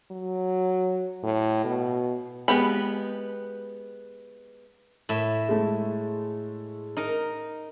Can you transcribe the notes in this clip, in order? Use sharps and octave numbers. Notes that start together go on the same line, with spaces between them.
F#3
A2
B2
G#3 B3 G4 B5
A2 E5
G#3 A3
D#4 A#4